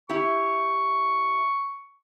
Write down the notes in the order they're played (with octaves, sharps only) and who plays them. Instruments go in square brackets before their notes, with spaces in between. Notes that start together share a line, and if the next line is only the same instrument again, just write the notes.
[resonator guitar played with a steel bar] E4 G4 [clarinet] C#6